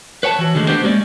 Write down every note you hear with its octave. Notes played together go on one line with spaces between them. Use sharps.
B4 C#5 G5 A5
E3 F#4
D3 D#3 G#3 A3
B3 D4 F#4 G4 C5
G#3 A#3 C#4 D5